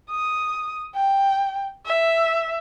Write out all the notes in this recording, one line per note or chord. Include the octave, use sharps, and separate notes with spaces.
D#6
G5
E5